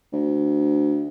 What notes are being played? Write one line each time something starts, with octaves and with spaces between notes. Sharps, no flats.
D2